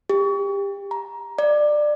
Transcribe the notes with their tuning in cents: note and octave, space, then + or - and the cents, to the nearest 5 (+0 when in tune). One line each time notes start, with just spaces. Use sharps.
G4 +25
A#5 +20
D5 +20